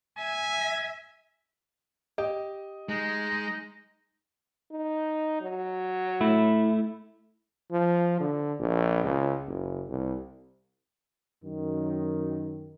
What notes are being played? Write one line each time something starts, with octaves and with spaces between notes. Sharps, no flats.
E5 G#5
G4 D#5
G#3 D#4
D#4
F#3
A3 E4
F3
D3
A#1
C#2
F#1
C2
F#2 D#3